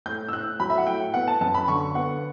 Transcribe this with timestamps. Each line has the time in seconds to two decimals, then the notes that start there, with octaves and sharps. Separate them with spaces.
0.06 A2 G6
0.28 E6
0.33 A2 F#6
0.59 F#3 B5
0.70 E5
0.78 F#5
0.87 A2 G5
1.14 B3 F#5
1.28 A5
1.41 F#2 A5
1.54 B5
1.68 D3 C#6
1.95 B3 F#5